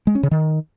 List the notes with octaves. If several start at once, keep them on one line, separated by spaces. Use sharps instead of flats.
G#3
C#4
C#3
D#3